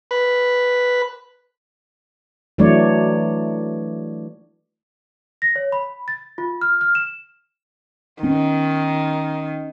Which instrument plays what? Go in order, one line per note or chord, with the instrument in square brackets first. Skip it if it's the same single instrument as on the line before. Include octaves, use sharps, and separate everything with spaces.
[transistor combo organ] B4
[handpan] E3 F#3 A3 D4 C#5 D5
[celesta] A#6
C#5
B5
A6
F4
F6
F6
E7
[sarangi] D#3 [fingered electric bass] B3 C#4